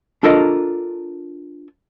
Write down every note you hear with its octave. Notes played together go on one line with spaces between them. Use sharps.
D4 F4 A4 A#4 D#5 A#5